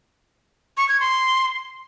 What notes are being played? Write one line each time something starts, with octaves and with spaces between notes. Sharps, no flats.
C#6
G#6
C6